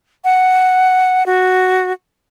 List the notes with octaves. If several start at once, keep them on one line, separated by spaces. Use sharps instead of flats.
F#5
F#4